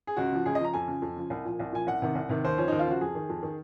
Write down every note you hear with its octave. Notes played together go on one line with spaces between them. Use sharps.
G#4
C#2 F#4
C#3 F3
C#2 G#4
D#5
C#3 F3 A#5
F2 G#5
C#3 F3
F2
C#3 F3
C2
A#2 F3
C2
A#2 F3 G#5
C2 F#5
C3 D#3
C2
C3 D#3
D#2 C5
C#3 F3 C#4
D#2 D#4
F4
C#3 F3 F#4
F2 G#4
D#3
F2
D#3